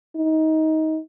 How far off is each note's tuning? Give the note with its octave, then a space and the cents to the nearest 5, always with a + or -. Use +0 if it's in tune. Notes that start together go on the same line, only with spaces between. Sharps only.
D#4 +20